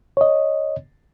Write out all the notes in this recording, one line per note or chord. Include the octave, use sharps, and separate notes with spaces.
C#5 D#5